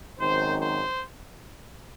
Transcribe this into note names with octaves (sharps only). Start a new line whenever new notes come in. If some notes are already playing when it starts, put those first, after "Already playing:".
G#1 F#2 D#3 C5
C5